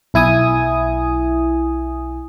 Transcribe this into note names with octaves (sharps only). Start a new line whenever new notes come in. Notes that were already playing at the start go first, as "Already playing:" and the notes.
B1 E4 G#5 D#6